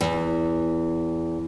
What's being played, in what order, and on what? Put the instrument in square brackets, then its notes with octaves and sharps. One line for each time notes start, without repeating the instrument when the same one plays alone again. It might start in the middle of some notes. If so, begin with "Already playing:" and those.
[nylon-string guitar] E2